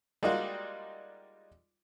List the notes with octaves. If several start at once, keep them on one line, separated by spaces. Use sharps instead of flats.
G3 G#3 A#3 D#4 F4 F#4